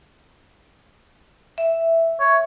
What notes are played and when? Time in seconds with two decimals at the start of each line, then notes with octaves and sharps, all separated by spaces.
1.58 E5
2.20 C#5